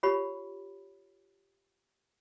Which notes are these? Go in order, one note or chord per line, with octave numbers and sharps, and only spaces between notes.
F4 G4 C#5 B5